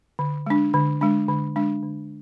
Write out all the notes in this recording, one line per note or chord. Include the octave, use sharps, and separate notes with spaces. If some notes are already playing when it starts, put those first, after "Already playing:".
D3
G#3 D4
D3
G#3 D4
D3
G#3 D4
D3